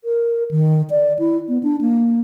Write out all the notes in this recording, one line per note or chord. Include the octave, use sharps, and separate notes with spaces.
A#4
D#3
D5
E4
B3
D4
A#3